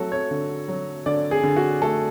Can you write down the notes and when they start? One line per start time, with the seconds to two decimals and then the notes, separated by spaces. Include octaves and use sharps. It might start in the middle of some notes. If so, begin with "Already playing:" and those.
Already playing: F#3 A3 F#4 A4
0.12 C#5
0.31 D3
0.68 F#3
1.06 D3 D5
1.31 G#4
1.43 D3
1.56 F#4
1.82 A3 A4